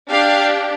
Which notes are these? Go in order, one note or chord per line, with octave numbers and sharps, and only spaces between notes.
D4 G4 F5